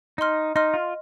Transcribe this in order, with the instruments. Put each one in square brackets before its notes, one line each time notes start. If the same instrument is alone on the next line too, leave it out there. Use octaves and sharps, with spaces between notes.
[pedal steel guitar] D#4 [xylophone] D#5 C6 F6
[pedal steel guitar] D#4 [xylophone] D#5 C6 F6
[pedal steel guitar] F4